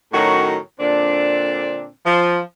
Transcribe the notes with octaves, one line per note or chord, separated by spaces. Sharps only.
A2 D#3 F#3 C#4 F#4
A#2 D3 C4 D4
F3